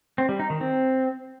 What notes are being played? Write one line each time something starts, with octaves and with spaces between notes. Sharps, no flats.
C4
G3
D#4
D#3
C4